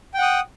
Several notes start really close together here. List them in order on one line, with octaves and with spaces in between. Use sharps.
G5 F#5 D#6